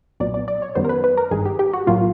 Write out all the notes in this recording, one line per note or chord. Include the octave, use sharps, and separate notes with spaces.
B1 A#2 F#3 B3 D5
D5
D5
C#5
F#2 D#3 G3 B3 C5
A#4
B4
B4
A#4
G#1 G2 D#3 G#4
G4
G4
F#4
B1 A2 F#3 A#3 F4